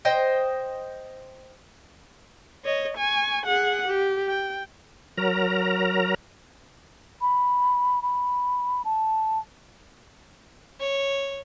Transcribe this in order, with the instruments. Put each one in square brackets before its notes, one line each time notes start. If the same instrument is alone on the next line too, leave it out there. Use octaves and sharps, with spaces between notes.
[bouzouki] C5 D#5 G5
[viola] C#5 D#5
G#5 C#6
G#4 F#5
G4
G5
[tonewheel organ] F#3 A#4 A#5
[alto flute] B5
B5
A5
[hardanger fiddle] C#5